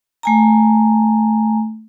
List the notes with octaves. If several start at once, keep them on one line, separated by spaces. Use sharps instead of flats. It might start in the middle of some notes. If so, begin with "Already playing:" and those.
A3 G#5 A#5